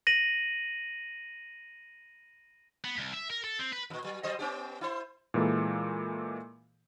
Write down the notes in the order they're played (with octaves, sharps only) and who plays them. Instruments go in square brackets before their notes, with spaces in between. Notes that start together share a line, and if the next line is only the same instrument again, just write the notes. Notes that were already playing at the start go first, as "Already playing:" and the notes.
[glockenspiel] A#6 D#7 F#7
[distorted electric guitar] B3
C2
E5
A#4
A4
C4
B4
[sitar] F2 A#2
F#3
F#3 C5 D#5
B3 C#4 G4
E4 C5
[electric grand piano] A#2 E3 G#3 A#3 A4